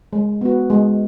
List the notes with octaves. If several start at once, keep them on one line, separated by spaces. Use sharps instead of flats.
G#3
B3 F#4
G#3